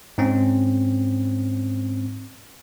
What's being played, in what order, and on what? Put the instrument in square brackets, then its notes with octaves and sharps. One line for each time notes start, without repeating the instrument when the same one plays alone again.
[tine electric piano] G#2 C4 C#4